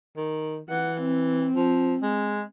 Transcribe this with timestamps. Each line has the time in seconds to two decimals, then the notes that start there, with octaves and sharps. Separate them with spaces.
0.17 D#3
0.70 E3 F#5
1.01 C4
1.56 F3
2.02 G#3